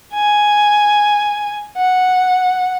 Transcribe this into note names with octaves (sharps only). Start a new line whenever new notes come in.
G#5
F#5